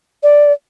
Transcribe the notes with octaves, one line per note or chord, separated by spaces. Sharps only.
D5